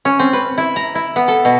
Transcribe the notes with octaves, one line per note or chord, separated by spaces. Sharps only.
C#4
C4
B4
E4
A#5
E4
B3
A4
B2